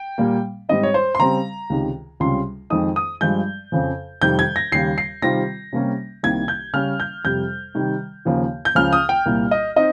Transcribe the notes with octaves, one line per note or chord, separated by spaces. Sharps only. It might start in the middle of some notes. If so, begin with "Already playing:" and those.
Already playing: G5
A#2 G3 A#3
G#2 G3 C4 D#4 D#5
C#5
C5
C6
C#3 G3 C4 A#5
C#2 C3 D#3
C#2 C3 G3 C#4 F4 C6
F2 D#3 G#3 D#4 D#6
D#6
G2 F3 G#3 G6
F2 C#3 F3
F2 C3 D#3 G3 G6
G#6
A#6
D#2 C#3 G3 C7
C7
C3 D#3 G3 C4 F4 A#6
C3 G3 A#3 C#4
C2 C3 D#3 G3 A#3 G#6
G6
C#3 G3 C#4 F6
G6
F2 C3 G3 G6
C3 D#3 G3
D#2 C#3 F3 A#3
G6
C#2 C#3 F3 F6
D#6
G5
C2 A#2 G3 A#3
D#5
C4 D#4 D#5